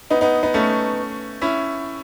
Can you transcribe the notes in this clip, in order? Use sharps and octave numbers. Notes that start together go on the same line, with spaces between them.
B3 D#4
B3 D#4
B3 D#4
A3 C#4
C#4 E4